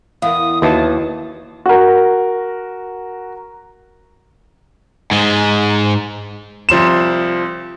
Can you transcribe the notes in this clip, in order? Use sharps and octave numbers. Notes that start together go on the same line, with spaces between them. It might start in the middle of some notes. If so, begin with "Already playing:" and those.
E2 A#4 F5 D#6
D#2 F#4 B4 E5 A5
F#4 A#4
G#2 G#3
C2 F3 C6 E7